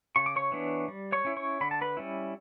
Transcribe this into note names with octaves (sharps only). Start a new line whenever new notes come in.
C#3 C#6
D6
C#5 C#6
E3 B3 D4
G3
C#5 C#6
C#4 E4
C#5 C#6
D3 B5
A5
B4 B5
G3 C#4 E4